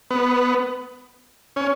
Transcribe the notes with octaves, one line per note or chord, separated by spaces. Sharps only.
B3
C#4